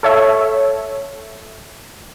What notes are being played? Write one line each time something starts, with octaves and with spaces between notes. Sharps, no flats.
A4 C#5 E5